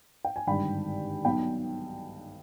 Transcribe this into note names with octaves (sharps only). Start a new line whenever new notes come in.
G5
G#5
G#1 G2 D3 G5 B5
B1 B2 G5 B5